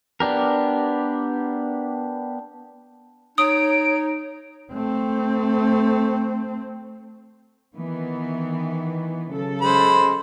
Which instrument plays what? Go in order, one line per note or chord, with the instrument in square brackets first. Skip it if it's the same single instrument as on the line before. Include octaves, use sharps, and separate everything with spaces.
[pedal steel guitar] B3 D4 G4 A#4
[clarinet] D#4 [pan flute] C#5 [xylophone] D#6 [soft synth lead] D7
[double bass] A3 C4
[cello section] D#3 E3 B3
C#3 F#3 A4
[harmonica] G#3 C5 B5